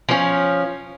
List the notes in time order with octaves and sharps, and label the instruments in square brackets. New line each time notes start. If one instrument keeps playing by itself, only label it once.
[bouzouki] F3 C#4